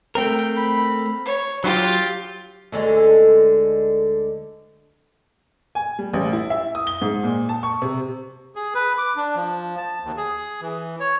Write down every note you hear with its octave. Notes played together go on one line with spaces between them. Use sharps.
A3 C4 A#4 G5
B5
C#5
F#3 F4 G4
D2 D3 G#3
G#5
G3
A1
E4
E5
D#6
G7
G#2
A#2
A5
C#6
C3
G#4
B4
D6
D4
F3
A5
D#2
G#4
E3
C#5